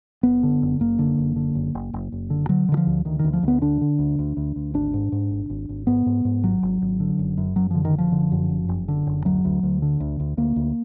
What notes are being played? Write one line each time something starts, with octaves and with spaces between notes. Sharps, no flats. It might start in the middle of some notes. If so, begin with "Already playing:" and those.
F#1 B3
D3
F#1
F#1 A#3
D3
F#1
D3
F#1
F#1
F#1
F#1
D3
D3 F#3
D3 D#3
F3
D2
D2 D#3
D#3
D2
F3
D2 B3
D3 D4
D3
D2
D2
D2
D2
G#1 D4
G#2
G#2
G#1
G#1
G#1
G#2 B3
G#2
G#2
G#1 F#3
G#1
G#1
D3
F#1
F#2
F#2 F#3
D3 F3
D#3
F#1 F3
D3
F#2
F#1
F#1
D3
F#1
D2 F#3
D2
D2
D3
D2
D2
D2 A#3
D2